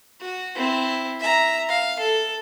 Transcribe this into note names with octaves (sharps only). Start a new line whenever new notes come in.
F#4
C4 E4
E5 A#5
F5
A4